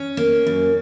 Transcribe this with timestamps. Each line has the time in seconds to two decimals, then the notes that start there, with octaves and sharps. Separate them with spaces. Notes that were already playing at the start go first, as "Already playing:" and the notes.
Already playing: C#4
0.17 A#3
0.47 F#2